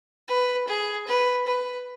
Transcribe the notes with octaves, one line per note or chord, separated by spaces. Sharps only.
B4
G#4
B4
B4